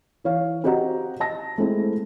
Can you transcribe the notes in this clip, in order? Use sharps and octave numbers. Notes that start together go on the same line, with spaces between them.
E3 C#5 F5
C4 F#4 G4 D#5 F#5 A#5
D#5 A5 A#6
G#3 A3 C4 E4